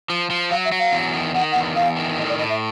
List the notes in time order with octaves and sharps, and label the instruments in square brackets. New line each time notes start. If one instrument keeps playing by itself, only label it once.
[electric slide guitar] F3
F3
[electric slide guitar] F#3 [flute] F5
[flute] E5
[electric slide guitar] F#3
[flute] F5
[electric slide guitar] E2
D#3
[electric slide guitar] D#3 [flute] F#5
[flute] F#5
[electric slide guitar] E2
[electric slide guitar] E2 [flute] F5
[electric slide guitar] D#3
[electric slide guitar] A2 [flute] D#5
[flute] D5
[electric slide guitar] A2 [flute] D#5
[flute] E5